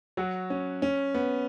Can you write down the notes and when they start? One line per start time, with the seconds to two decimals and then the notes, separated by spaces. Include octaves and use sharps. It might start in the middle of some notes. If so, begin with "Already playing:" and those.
0.17 F#3 F#4
0.50 C#4
0.82 C#4
1.14 B3